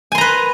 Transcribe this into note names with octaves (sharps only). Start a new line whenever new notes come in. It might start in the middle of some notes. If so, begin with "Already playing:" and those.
B4 G#5 A#5 C6